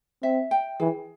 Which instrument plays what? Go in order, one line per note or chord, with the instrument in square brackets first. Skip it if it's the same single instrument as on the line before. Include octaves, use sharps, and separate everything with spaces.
[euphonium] C4 [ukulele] E5
[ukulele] G5
[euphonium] E3 [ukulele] G#4